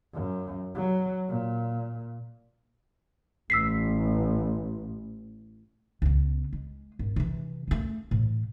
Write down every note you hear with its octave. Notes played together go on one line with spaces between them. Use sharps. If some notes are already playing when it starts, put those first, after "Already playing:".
F#2
F#3
A#2
A1 E6 B6 C7
C#2 B3
G#3
G#1
C3 E3
A3 C#4
A2 E3